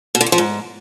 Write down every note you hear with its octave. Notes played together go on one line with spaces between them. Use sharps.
B2
D3
E2
F3
G#2